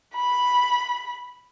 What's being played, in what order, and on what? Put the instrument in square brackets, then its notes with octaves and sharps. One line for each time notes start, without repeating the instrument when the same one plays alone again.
[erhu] B5